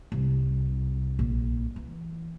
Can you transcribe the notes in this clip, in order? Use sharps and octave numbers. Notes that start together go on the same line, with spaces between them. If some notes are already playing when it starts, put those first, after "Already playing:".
C2
A#1
E3